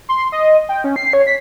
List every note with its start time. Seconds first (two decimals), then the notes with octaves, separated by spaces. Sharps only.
0.09 C6
0.32 D#5
0.69 G5
0.84 C#4
0.96 C7
1.13 C#5
1.27 B6